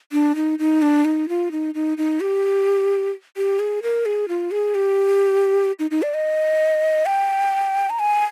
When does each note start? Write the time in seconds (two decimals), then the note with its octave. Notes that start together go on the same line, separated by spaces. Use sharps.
0.12 D4
0.36 D#4
0.59 D#4
0.82 D4
1.05 D#4
1.29 F4
1.51 D#4
1.74 D#4
1.98 D#4
2.20 G4
3.37 G4
3.59 G#4
3.83 A#4
4.06 G#4
4.28 F4
4.51 G#4
4.75 G4
5.79 D#4
5.91 D#4
6.02 D5
6.14 D#5
7.06 G5
7.90 A#5
7.99 G#5